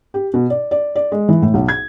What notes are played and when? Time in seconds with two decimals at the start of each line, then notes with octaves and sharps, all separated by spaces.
0.14 G4
0.34 B2
0.50 D5
0.71 D5
0.96 D5
1.12 G#3
1.29 E3
1.42 A2
1.54 B1
1.68 G#6